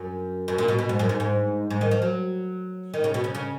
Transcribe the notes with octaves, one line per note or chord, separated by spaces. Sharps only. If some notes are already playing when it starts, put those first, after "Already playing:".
Already playing: F#2
F#2
A#2
B2
B2
G#2
F#2
G#2
G#2
G#2
D#3
F3
F#3
D#3
C#3
B2
C#3
C#3